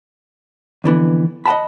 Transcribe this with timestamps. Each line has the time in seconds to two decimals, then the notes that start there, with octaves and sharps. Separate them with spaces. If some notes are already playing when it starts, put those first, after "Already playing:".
0.84 F2 D3 E3 B3
1.46 D#5 F#5 G5 A5 B5